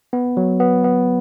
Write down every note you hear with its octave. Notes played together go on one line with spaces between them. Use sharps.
B3
F#3
B3
B3